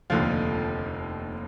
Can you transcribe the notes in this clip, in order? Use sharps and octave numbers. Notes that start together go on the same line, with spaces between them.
F1 D#2 D3 F3 F4